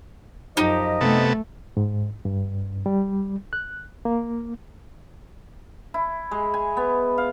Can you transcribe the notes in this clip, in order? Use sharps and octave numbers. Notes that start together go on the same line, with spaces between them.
F#2 F3 D#4 G4 D#5
C3 A3 B3 A4
G#2
G2
G3
F#6
A#3
E4
G#3
G#5
B3
F5